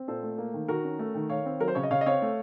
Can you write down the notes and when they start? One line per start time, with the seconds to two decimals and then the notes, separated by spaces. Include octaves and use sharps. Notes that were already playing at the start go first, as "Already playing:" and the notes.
Already playing: C4
0.08 A#2 A4 C5
0.23 A3
0.38 A#3
0.54 D#3
0.68 D#3 F#4 A#4
0.84 C#4
0.99 A3
1.15 D#3
1.29 D#3 C#5 F5
1.45 C4
1.60 F#3 A#4
1.68 C5
1.75 C#3 C#5
1.83 D#5
1.91 C#3 C#5 F5
2.01 D#5
2.06 C4 C#5 F5
2.22 A3